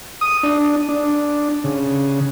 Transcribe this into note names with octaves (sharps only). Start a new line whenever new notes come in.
D#6
D4
D4
C#3